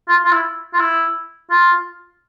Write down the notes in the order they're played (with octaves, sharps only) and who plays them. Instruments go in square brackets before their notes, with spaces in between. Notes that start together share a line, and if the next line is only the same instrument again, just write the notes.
[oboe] F4
F4
E4
F4
E4
F4